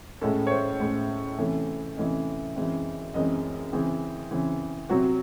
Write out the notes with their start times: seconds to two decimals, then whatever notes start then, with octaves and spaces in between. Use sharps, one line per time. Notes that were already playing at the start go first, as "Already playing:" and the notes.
0.21 A2 G#3 C#4 A4
0.47 C#5
0.51 C5
0.80 A2 G#3 C#4
1.39 C3 E3 A3 C#4
1.97 C3 E3 A3 C#4 D#5
2.56 F#2 E3 G#3 C4
3.14 F#2 E3 G#3 C4 D#5
3.73 C#3 E3 C4 G#4
4.31 C#3 E3 C4
4.89 C3 F#3 C4 F#4